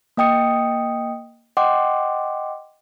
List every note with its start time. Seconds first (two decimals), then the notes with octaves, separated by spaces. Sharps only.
0.17 A#3 D#5 G5 D#6 C#7
1.57 D#5 F#5 G5 C6 D6